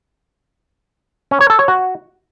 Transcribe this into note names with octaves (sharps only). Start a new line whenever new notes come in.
C#4
C#5
A4
C#5
F#4